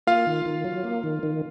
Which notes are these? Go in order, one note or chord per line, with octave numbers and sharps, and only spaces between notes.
A#3 F4 F5
D#3
D#3
F#3
A#3
D#3
D#3